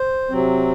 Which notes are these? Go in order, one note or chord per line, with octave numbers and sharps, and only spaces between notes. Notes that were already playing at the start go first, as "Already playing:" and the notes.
Already playing: C5
C3 F#3 C4